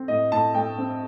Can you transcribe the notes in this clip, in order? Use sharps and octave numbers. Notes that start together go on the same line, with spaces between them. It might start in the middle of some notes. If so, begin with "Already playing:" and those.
Already playing: C4
A2 D#5
A2 A5
A3 G5
C4